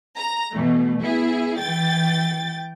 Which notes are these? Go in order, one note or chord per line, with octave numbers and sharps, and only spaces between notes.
A#5
B2 E3 A3
B3 E4 G#4
E3 G5 A6